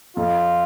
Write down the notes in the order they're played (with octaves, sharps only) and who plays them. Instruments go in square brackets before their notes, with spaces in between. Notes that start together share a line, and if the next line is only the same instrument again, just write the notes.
[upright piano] F2 [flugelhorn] F4